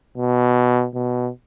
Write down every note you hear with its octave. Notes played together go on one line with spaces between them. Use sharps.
B2
B2